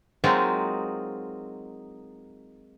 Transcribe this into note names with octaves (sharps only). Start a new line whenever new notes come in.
F#3 G#3 A#3 C4 D#4 F4